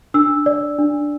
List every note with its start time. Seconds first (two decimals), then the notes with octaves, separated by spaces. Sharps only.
0.14 D4 E6
0.46 D5
0.78 D4